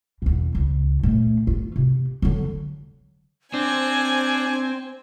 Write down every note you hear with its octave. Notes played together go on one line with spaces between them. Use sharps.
E2 B2
C#2
A#2 A3
F4
C3
D3 F#3
C4 D4 C5 G#5